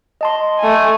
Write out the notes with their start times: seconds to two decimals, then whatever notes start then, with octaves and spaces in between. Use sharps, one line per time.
0.21 D#5 A5 C6
0.59 A3 G#5